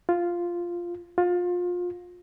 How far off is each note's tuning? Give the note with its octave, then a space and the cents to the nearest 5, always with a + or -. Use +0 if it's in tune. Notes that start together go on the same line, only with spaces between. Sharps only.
F4 -5
F4 +25